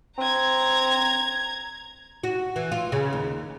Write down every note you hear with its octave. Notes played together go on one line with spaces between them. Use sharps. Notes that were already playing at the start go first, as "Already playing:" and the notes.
C4 A#5 G#6
F#4
E3
F4
C#3
D#2